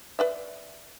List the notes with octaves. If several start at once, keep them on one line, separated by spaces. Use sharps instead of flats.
B4 D5 E5